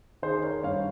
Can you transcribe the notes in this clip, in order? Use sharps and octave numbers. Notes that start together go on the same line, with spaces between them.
D#3 G#4 C5
A#4 C#5
G2 C#5 F5